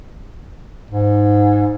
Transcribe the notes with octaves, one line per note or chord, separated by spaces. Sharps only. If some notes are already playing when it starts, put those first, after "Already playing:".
G#2